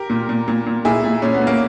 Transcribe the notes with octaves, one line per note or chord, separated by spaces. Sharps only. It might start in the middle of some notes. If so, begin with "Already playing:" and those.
Already playing: G4 A#4
A#2
A#2
A#2
A#2
A#2 E4 G#4
A#2
A#2 C#4
B3
A#2
A#3